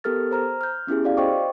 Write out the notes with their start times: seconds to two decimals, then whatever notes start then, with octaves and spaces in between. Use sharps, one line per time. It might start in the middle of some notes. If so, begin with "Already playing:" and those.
0.04 B3 G4 A4 A#4 F6 A6
0.31 C5 A#5 F6
0.61 F6 G6
0.87 B3 C#4 E4 G4 G#4
1.04 F#4 D5 F5
1.17 C5 D#5 G5 C#6 D6